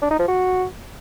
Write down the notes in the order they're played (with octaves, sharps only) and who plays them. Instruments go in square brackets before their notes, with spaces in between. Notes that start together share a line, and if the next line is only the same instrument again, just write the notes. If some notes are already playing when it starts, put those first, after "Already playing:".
[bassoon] D4
D#4
F3
F#4